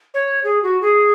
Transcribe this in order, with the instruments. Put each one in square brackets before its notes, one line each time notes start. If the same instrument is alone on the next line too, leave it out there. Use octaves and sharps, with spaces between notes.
[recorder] C#5
G#4
F#4
G#4